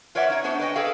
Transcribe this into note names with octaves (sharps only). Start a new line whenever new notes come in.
F4 B4 C#5 D5 E5 F#5
D#4 C#5
B3 D4 C5 C#5
B4 D#5 G5
G#4 A4 B4 F5